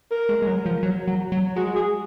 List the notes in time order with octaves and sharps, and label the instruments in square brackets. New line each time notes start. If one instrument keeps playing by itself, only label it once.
[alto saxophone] A#4
[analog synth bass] G#3
G#3
F#3
F3
F#3
F#3
F#3
[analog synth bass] G#3 [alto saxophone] F#4
[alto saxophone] G#4